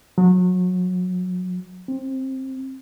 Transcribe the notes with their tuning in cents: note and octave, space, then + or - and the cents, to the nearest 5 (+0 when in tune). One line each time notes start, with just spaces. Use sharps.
F#3 -25
C4 +15